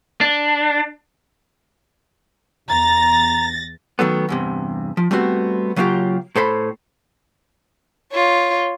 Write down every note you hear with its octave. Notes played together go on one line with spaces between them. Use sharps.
D4
E2 A#5 A6 A#6
D#3 F#3 A3 B3
E2 G2 C3
F3
G3 A3 B3 C4 F#4
C#3 F#3 A#3 B3 F4 G4
A2 A4 C5 B5
F4 C#5